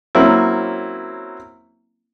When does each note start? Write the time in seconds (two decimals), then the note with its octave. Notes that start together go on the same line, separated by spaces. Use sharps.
0.15 F#3 A#3 C4 C#4 E4